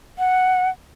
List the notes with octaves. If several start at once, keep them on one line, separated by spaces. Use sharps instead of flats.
F#5